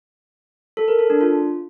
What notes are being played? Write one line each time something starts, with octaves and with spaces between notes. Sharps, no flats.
A4
A#4
A4
D4
F4